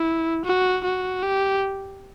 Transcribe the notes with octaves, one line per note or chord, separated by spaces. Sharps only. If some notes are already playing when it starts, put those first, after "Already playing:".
Already playing: E4
F#4
F#4
G4